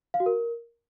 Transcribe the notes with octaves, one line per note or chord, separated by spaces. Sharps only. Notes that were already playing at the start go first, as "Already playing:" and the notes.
F5
F#4
A#4